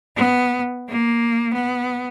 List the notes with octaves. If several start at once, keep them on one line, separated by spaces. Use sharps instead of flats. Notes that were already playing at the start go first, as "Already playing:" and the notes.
B3
A#3
B3